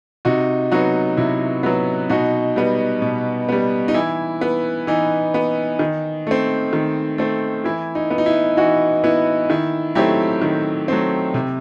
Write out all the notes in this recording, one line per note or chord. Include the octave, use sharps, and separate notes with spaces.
C3 D#4 F#4
F#3 B3 D#4 F#4
C3 E4
F#3 B3
B2 D#4 F#4
G3 B3
B2
G3 B3
D#4
E3 E4
B3
E3 D#4
B3
D#3
A3 C4
D#3
A3 C4
E3 E4
D#4
B3
D#4
E4
E3 D#4 F#4
B3 E4
D#3 E4
F#3 A3 C4 E4 G4
D#3
F#3 A3 C4
C3